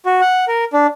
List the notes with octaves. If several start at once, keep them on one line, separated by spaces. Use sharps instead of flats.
F#4
F#5
A#4
D4